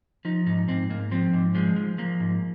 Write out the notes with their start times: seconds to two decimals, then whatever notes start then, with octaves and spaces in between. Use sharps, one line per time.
0.25 F3 D#4
0.46 G#2 D#4
0.68 G#2 C4
0.90 G#2 A#3
1.11 F3 C4
1.33 G#2
1.55 F3 G#3
1.76 F3
1.98 F3 A#3
2.20 G#2